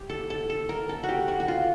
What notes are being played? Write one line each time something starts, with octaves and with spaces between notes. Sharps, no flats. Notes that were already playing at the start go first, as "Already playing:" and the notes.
Already playing: G4
A4
A4
A4
A#4
A4
F#4
G4
F#4
F#4
F4